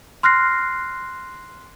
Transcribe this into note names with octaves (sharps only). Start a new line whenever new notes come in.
C6 F6 F#6 A#6 C7